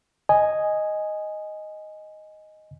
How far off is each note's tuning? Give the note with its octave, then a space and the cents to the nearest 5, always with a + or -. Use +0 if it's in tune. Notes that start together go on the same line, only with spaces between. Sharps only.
D#5 +0 G#5 +0